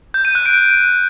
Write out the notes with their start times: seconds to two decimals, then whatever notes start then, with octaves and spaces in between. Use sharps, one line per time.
0.14 G6
0.25 D#7
0.35 F#6
0.46 D7